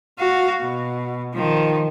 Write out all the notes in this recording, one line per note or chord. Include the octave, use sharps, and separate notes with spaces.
F#4 F5
B2
D#3 F3